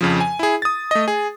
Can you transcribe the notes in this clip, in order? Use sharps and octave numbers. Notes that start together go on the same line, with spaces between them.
F2 C#3 F3
G#5
E4 G#4
D#6 A6
A3 D#5
G#4